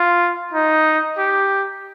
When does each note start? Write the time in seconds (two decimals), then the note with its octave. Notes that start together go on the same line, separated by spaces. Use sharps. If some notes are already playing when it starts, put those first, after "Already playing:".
Already playing: F4
0.53 D#4
1.18 G4